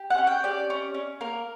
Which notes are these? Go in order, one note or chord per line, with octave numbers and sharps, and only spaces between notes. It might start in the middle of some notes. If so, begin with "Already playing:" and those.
Already playing: G4
F#5
C#4
G5
G4 D5
C#4
C#4
A#3 A#4